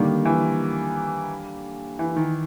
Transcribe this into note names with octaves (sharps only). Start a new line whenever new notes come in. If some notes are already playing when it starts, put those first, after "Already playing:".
Already playing: D3 D#3 G3 A#3 D4
E3
E3
D#3